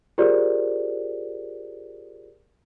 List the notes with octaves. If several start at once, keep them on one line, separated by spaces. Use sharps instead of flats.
F4 G4 G#4 A#4 C5 D5